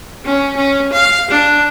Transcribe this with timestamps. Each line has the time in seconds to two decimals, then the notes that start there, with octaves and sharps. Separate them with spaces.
0.25 C#4
0.57 C#4
0.93 F5
1.31 D4